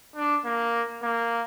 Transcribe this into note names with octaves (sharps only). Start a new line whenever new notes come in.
D4
A#3
A#3